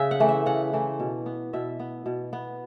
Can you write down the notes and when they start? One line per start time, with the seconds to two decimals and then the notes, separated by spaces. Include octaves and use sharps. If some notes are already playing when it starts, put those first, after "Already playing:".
Already playing: C#3 E5
0.11 F#5
0.20 E3 A3
0.29 E5
0.46 C#3 F#5
0.73 E3 A3
1.00 B2
1.26 B3
1.53 B2 E5
1.79 B3
2.06 B2
2.33 B3